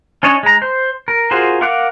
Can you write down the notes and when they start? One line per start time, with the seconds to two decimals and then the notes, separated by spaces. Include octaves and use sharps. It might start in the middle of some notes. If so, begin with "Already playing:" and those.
0.23 C#4 D4 C#5 D#5
0.43 G#3 A#5
0.62 C5
1.08 A#4
1.31 F4 F#4 G#4 A#4 C5
1.61 A#4 F5 F#5 D6 F#6